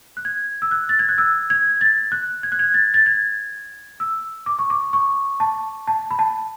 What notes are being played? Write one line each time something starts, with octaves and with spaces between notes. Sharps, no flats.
F#6
G#6
E6
F#6
A6
G#6
F#6
E6
G#6
A6
F#6
G#6
F#6
G#6
A6
A6
G#6
E6
D6
C#6
D6
C#6
A5
A5
B5
A5